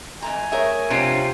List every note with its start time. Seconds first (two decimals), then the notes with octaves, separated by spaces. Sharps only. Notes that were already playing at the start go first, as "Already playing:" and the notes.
0.22 F2 A3 G#5 A#5
0.52 A3 G#4 A#4 C#5 E5
0.90 G#2 C3 B3 C4 D4 F4